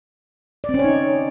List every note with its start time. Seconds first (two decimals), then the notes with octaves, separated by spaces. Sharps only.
0.64 D5
0.69 C4
0.74 C#4
0.79 C#5
0.84 D#4